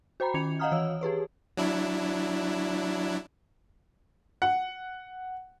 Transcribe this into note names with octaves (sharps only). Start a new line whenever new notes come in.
F#4 C5 G5 A#5 B5
D#3 C#4 G#6 C#7 F7
D#5 F5 F#5 A#5 D#6 F6
E3 C#5 E6
G4 G#4 B4 C#5
F#3 D4 E4
F#5